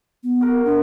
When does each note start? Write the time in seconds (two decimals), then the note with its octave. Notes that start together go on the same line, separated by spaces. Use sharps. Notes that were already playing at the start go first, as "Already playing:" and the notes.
0.24 B3
0.41 F#4 A#4
0.65 D4